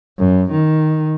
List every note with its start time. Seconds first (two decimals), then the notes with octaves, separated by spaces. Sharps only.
0.19 F#2
0.52 D#3